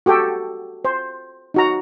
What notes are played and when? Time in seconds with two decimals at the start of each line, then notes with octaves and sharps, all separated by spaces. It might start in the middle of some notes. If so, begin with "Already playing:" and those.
0.06 F#4 G4 A4 G5
0.85 C5
1.54 D#4 F#4 A#5